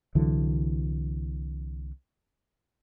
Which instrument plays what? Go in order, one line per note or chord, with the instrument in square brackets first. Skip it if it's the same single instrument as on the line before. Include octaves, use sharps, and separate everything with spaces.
[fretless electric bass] C2 D3 E3 F#3